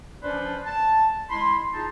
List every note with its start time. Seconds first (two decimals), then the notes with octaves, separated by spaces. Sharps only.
0.23 F3 C#4 D4 B4 C5 D5
0.65 A5
1.30 G#3 E4 B5 C6
1.73 D#4 F4 G#4 A5